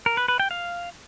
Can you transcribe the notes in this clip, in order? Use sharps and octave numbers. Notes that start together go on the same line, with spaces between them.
A#4
B4
B4
G5
F5